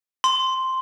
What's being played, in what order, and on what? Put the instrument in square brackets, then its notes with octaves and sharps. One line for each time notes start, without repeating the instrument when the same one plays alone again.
[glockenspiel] C6